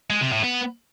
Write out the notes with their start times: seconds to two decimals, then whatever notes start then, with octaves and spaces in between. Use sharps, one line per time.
0.10 G#3
0.21 C3
0.33 A2
0.44 B3